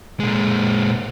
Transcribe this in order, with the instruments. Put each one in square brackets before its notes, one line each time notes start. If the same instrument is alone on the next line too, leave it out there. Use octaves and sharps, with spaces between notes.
[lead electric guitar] A#2 G#3